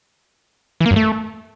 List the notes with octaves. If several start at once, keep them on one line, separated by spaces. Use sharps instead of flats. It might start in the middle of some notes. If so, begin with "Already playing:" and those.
E3
A#3
F#2
A3